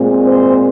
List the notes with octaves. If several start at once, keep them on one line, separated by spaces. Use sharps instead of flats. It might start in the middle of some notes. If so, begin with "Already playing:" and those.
Already playing: A#2 G#3 C4
C5